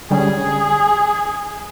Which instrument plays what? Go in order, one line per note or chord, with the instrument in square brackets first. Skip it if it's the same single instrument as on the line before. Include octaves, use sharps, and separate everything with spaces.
[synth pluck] D3 G3 C#4 [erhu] G#4